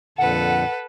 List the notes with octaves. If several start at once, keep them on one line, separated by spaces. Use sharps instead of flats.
F2 A#2 D3 A4 B4 F#5